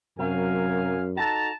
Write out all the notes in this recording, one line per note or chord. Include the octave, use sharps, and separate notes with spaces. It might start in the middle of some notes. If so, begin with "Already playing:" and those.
F#2 C3 F#3 A#4 F5 G#5
D#4 F#4 A4 A5 A#5